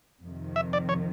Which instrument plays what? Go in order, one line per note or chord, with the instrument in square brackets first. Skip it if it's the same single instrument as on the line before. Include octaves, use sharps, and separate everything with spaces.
[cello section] F2 C3 D#3
[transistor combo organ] E5
D5
C#5